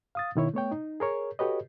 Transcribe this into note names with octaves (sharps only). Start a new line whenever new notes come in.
F5 D#6 A6
B2 D#3 E4 C#5
A3 B3 C#5 G5
D#4
G#4 A#4 C#5
F#4 G4 A4 B4 C#5 D#5